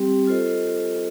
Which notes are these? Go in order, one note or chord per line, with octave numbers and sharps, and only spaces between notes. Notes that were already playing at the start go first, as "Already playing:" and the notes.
Already playing: G3 C4 G4
F4 A4 C5 D#5